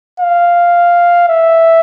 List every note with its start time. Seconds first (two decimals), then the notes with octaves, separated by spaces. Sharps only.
0.20 F5
1.29 E5